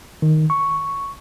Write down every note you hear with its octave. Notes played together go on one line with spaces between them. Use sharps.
D#3
C#6